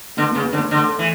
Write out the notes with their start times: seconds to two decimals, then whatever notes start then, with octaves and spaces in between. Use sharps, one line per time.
0.17 D3 B3
0.31 C#3 B3
0.45 B3
0.52 D3 C#4
0.58 B3
0.71 D3 A3
0.89 A3
0.99 E3